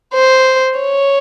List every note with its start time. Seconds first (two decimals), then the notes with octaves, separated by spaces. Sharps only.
0.14 C5
0.80 C#5